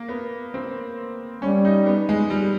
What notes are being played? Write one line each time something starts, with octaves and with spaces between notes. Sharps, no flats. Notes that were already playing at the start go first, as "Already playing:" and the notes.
Already playing: A#3
B3
C4
G3 C#4
D#4
B3
G#3
G3